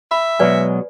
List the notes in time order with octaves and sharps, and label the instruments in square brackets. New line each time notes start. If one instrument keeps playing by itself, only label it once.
[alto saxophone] E5 [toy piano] B5
[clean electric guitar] B2 F#3 G#3 [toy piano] B4 D5 G#5